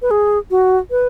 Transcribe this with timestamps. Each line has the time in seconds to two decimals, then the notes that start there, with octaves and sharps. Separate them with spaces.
0.02 B4
0.11 G#4
0.51 F#4
0.91 B4